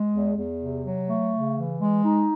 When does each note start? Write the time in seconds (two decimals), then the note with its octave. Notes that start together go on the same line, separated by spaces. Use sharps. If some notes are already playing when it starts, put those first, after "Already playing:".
Already playing: G#3
0.13 E2
0.37 E2
0.61 C3
0.84 F#3
1.09 A3
1.32 C#3
1.56 E3
1.80 G#3
2.04 D#4